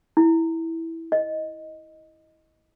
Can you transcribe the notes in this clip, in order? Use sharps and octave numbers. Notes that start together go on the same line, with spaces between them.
E4
D#5